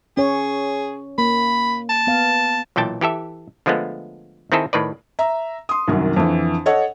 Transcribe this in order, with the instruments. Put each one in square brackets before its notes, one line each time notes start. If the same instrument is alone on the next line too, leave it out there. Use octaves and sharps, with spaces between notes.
[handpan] C#4 C#5 [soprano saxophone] G#4
[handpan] A#3 [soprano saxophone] B5
[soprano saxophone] A5
[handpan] B3 F5
[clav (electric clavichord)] B1 A#2 E3 G5 A5
E3 G4 A4 E5
D3 F3 G#3 A3 B3
D#3 C4 D#4 E4 G#4 A4
A2 D#3 B4 D5
[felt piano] E5 A#5
C6 D#6
C2 F#2 D#3 F#3
F2 D3 E3
A4 C#5 D#5 F#5